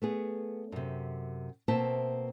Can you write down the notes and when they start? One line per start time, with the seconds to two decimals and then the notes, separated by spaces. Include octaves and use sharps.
0.02 A3 B3 G#4
0.72 F#2 C3
1.68 B2 A#3 C4 C5 E5 A5